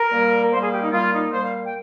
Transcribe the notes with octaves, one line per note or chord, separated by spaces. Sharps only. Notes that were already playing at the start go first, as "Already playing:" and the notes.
Already playing: A#4
A#2 G3 A#3
A#2 G3 A#3 C5
G#4
G4
D#4
A#2 G3 A#3 F4
D#4
A#2 G3 A#3 C5
F5
G5